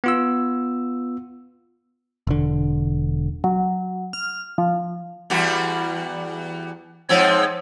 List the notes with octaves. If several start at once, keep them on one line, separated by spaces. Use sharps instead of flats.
B3 F4 E6
E1 D3
F#3
F6
F3
E2 G3 F#4
G#2 F3 C4 C#5 E6